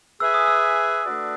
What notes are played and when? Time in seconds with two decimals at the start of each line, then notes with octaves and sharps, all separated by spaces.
0.20 G#4 B4 E5 G#5 E6
0.34 D#6
0.48 E6
1.05 A3 D4 F#4 B4 D5